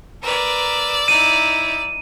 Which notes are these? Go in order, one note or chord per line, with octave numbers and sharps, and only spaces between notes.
A#4 B4 D5 E6
D#4 E4 D#7